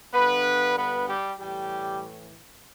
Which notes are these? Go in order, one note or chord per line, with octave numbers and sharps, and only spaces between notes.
G2 D3 B3 B4
B3 B4
G3 G4
A2 E3 G3 G4